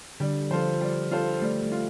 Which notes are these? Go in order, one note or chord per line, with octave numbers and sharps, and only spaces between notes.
D3 G3
F3 F4 A4 C5
G3
F4 A4 C5
G3 A3
A3
F4